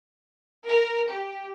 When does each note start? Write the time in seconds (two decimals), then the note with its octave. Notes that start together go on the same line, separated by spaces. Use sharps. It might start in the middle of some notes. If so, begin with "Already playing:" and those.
0.67 A#4
1.09 G4